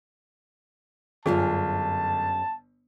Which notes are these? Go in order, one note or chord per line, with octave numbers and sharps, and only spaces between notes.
G1 F#2 F4 G#4 A5